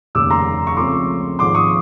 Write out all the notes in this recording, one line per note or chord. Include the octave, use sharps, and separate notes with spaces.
F1 D#2 C#3 D6 E6
A#5 C6
C#6
C#2 C#3 F3 A3 C4 C6 D6
G#1 G#2 F3 C6 D6
C#6 D#6